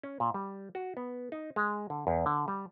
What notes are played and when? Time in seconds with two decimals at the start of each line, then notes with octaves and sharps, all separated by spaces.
0.03 C#4
0.20 A#2
0.34 G3
0.75 F#4
0.97 B3
1.32 D#4
1.56 G#3
1.90 D3
2.07 E2
2.26 D3
2.48 G3